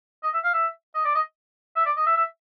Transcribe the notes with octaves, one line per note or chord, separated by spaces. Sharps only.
D#5
E5
F5
E5
D#5
D5
D#5
E5
D5
D#5
E5
E5